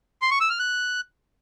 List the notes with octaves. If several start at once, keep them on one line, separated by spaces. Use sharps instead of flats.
C6
C#6
E6
F6
F#6